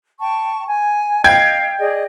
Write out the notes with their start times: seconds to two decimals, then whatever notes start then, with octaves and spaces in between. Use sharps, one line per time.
0.20 G5 A5 C#6
0.69 G#5
1.24 D#5 F5 G5 G#6
1.81 G#4 D5 D#5